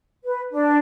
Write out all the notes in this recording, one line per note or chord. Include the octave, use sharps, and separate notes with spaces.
B4
D4